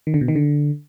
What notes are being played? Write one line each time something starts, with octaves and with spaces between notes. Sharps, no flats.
D#3
D3
B2
D#3
D3